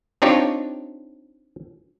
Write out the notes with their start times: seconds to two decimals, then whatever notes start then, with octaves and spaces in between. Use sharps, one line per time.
0.22 C4 D4 D#4 F4 G4 C#5